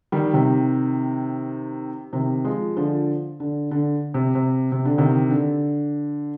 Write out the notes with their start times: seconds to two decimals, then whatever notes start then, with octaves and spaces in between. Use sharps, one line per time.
0.12 D#3 G3
0.33 C3 D#3
2.13 C3 D#3
2.45 F3 G#3
2.77 D3 F3
3.40 D3
3.71 D3
4.14 C3
4.35 C3
4.72 C3
4.85 D3
4.98 C3 D#3
5.30 D3